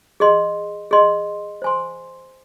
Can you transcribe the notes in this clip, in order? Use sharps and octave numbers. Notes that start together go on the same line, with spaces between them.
G#4 D#5 C6
G#4 D#5 C6
C5 G#5 C6